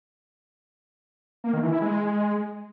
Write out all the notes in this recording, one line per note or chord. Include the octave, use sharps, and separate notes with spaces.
A#3
D#3
E3
E4
G#3